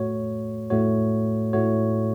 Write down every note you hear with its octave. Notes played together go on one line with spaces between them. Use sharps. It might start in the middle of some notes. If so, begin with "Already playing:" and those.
Already playing: A2 A3 F#4 C#5
A2 A3 F#4 C#5
A2 A3 F#4 C#5